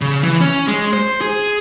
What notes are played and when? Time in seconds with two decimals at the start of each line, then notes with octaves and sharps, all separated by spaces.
0.01 C#3
0.23 E3
0.41 C#4
0.68 G#3
0.93 C5
1.21 G#4